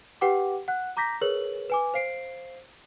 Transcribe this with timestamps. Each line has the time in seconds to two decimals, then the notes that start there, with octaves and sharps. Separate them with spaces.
0.21 G4 B4 F#5 G5 D6
0.68 F#5 F#6
0.97 A#5 D6 G6 A#6 B6
1.21 G#4 A#4 B4 C#5 F#7
1.70 B4 G#5 D6
1.94 C5 F5 C7 D7